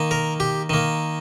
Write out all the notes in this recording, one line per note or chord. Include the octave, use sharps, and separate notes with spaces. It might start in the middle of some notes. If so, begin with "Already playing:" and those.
Already playing: D#3 A#3
A#4
G4
D#3 A#3